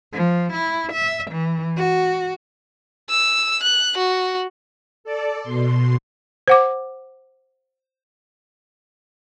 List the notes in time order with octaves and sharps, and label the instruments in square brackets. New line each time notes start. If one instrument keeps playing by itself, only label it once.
[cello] F3
E4
E5
E3
F#4
[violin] E6
F#6
F#4
[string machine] A4 D5
B2 C6
[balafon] C5 F#5 D6